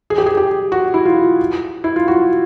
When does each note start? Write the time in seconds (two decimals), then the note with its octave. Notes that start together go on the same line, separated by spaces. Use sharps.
0.10 G#4
0.18 G4
0.26 G#4
0.37 G4
0.72 F#4
0.94 E4
1.05 F4
1.84 E4
1.96 F4
2.08 F#4